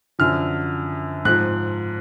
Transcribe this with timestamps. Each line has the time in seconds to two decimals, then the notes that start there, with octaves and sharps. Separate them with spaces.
0.19 F#2 D3 F3 F6
1.25 G#2 F3 F#6